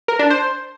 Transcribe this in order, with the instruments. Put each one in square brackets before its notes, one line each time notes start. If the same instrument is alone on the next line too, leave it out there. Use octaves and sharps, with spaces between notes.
[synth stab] A#4
D4
C5